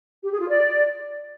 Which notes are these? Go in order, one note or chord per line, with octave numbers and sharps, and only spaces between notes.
G4
G#4
F4
D5